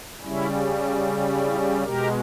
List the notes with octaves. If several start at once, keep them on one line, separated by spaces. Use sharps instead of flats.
C#3 G3 C#4 E4
E4 G#4
B2 G#3 G4 A#4